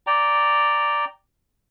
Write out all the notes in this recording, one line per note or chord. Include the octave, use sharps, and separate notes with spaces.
D5 G5 A#5